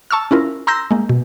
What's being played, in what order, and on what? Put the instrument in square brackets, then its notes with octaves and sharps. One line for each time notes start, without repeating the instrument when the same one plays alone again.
[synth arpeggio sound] A5 C#6 E6 F6
C#4 E4 F4 A#4
A#5 C6 E6 G6 A#6
G#3 A#3
B2